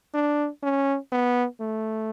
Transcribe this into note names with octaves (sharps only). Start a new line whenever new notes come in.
D4
C#4
B3
A3